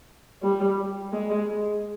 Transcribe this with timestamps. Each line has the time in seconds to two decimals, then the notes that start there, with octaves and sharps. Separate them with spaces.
0.43 G3
1.13 G#3